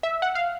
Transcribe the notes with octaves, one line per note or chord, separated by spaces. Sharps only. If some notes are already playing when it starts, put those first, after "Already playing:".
E5
F#5
F5